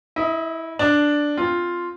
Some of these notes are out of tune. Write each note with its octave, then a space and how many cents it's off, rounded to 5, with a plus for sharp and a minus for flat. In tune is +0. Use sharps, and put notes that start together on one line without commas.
E4 -15 D#5 +20
D4 +0 D5 +0
C4 +0 F4 +0